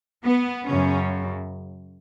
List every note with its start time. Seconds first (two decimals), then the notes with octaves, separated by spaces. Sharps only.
0.24 B3
0.66 F#2 C#3 F#3 C#4